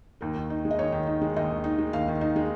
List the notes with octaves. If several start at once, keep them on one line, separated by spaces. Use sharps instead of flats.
D#2 A#4
D#3
D#4
G#3
D#5
D#2 C#5
D#3
D#4
G#3
D#2 D#5
D#3
D#4
G#3
D#2 F5
D#3
D#4
G#3